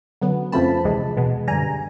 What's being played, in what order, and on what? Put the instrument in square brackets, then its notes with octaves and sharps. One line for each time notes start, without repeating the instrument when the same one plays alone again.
[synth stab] F#2 D3 F#3 B3
F2 C#3 F3 A3 C4 A5 B5
D2 C3 E3 G#3
E2 B2 G#3 B3
F#2 D3 G3 G#5 A#5